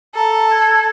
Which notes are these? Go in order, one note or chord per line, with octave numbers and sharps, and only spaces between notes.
A4 A#5
G#6